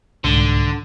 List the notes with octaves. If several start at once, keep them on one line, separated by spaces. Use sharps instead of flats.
C2 G#2 D3